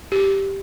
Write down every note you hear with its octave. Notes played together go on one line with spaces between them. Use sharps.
G4